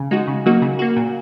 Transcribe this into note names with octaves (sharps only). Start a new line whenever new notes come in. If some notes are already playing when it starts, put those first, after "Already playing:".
Already playing: C#3
G#3 D#4 F#4
C#3
F#3 A#3 D#4 F#4
C#3
A#3 F#4
A#2